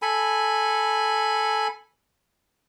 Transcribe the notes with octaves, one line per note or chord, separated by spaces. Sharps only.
A4 G#5 B5